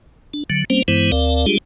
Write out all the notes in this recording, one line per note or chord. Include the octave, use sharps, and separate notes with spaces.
D4
D3 F#3
G3 A#3 C4 C#4 C5
G2 E3 G#3 B3 E4 C5
D2 C4 A#4 D5 F5
G3 G#3 D4 F4 G4 G#4